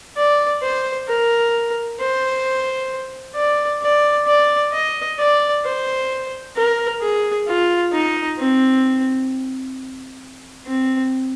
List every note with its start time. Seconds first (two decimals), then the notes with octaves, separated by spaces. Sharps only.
0.17 D5
0.62 C5
1.08 A#4
2.00 C5
3.36 D5
3.82 D5
4.27 D5
4.73 D#5
5.19 D5
5.65 C5
6.56 A#4
7.02 G#4
7.47 F4
7.92 D#4
8.38 C4
10.67 C4